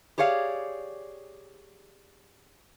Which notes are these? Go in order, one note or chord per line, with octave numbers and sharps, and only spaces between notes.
G4 G#4 C#5 D5 F5